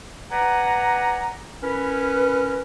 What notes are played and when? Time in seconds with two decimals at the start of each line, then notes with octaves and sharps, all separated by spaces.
0.31 B4 D5 F#5 G#5 A#5
1.61 C#4 E4 A#4 B4